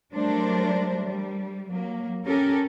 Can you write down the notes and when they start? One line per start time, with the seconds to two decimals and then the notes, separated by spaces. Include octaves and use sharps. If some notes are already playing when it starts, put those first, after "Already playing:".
0.13 F#3 G3 A3 D4 A#4 C5
1.01 G3
1.69 F#3 A#3
2.25 C#4 G4 A4 A#4